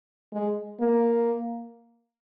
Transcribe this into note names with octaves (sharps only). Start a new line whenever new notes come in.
G#3
A#3